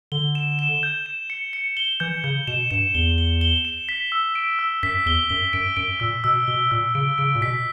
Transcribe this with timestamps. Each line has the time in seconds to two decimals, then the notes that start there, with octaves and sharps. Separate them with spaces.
0.12 D3 G7
0.35 E7
0.59 E7
0.83 G6
1.06 E7
1.30 C#7
1.53 C#7
1.77 G7
2.00 E3 G6
2.24 C#3 G6
2.47 B2 E7
2.71 G2 E7
2.94 E2 G7
3.18 G7
3.41 G7
3.65 E7
3.89 B6
4.12 E6
4.35 D7
4.59 E6
4.83 F#2 B6
5.06 E2 G7
5.30 F#2 G7
5.53 F#2 D7
5.76 F#2 D7
6.00 A#2 E6
6.24 B2 E6
6.47 B2 G7
6.71 A#2 E6
6.95 C#3 D7
7.18 C#3 D7
7.35 A#2
7.41 B2 B6